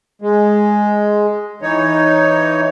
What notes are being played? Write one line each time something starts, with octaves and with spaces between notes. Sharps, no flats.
G#3
E3 D#4 C#5